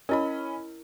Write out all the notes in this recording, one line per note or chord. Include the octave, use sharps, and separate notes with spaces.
C#4 E4 A#4 D#5 B5